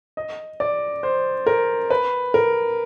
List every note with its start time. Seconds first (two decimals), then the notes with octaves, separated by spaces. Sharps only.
0.17 D#5
0.60 D5
1.03 C5
1.47 A#4
1.90 B4
2.34 A#4